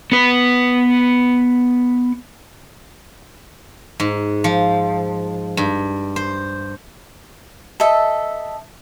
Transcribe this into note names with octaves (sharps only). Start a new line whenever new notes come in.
B3 B4
G#2
F3
G2
C5
A4 D#5 E5